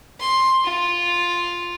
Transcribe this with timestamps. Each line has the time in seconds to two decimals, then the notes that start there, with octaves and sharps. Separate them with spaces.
0.20 C6
0.65 F4